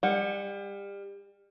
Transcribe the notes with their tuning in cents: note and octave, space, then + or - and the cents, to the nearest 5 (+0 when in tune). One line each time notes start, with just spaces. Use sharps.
G3 +30 F#5 +0